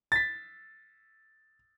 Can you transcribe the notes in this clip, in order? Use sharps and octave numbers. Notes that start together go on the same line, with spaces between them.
A6 B6